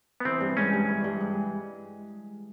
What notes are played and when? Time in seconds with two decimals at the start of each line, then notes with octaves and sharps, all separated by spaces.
0.20 B3
0.25 E3 C4
0.41 G2
0.57 G#3 C#4
0.73 G2
0.89 E3
1.04 G2
1.20 G#3